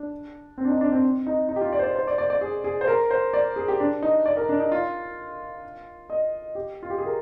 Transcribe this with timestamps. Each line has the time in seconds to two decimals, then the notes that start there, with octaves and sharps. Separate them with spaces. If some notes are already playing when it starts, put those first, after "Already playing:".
Already playing: D4
0.58 C4
0.65 D4
0.69 D#4
0.81 D4
0.92 C4
1.27 D#4
1.49 D#4
1.56 G4
1.61 F4
1.72 D5
1.79 C5
1.83 D5
1.96 C5
2.08 D5
2.18 D5
2.30 D5
2.41 G#4
2.64 G#4
2.81 C5
2.88 A#4
3.11 C5
3.33 D5
3.56 G#4
3.68 G4
3.80 D4
4.03 D#4
4.26 D5
4.37 A#4
4.49 D4
4.60 D#4
4.72 F4
6.10 D#5
6.55 G4
6.83 F4
6.90 G4
6.98 G#4
7.06 A#4